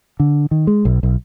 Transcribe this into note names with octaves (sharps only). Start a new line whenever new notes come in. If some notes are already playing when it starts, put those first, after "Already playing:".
D3
D#3
G#3
B1
B1